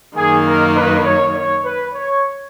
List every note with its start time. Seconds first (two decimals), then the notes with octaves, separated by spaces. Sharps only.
0.16 F#2 D#3 A#3 G#4
0.46 A#4
0.75 B4
1.04 C#5
1.34 C#5
1.64 B4
1.93 C#5